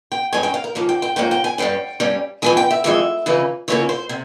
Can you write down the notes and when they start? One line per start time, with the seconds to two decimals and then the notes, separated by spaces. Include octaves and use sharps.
0.12 G5
0.33 G2 E3 G#3 C#4 G#5
0.43 G5
0.54 F5
0.64 A#4
0.75 G#2 F3 A#3 C#4
0.89 G5
1.02 G5
1.16 G#2 F3 A#3 C#4 G5
1.31 G5
1.44 G#5
1.58 G2 G3 C#4 G5
2.00 G2 G3 C#4
2.42 F2 E3 G#3 G#5
2.57 G5
2.71 E5
2.84 F2 E3 G#3 E5
3.26 F2 C#3 E3 A#3 C#4
3.68 F2 C#3 E3 A#3 C#4 C#5
3.89 C5
4.09 C3